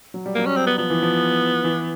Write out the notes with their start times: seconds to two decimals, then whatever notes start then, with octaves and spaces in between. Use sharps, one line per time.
0.14 F#3
0.26 G3
0.35 A#3
0.39 F#3
0.46 C#4
0.57 C4
0.67 B3
0.78 F3 B3
0.90 E3
1.03 F3
1.64 E3